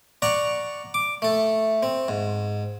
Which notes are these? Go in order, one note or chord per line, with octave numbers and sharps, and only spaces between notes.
D5 F#5 A#5 C#6
D6
A3 A4
C4
G#2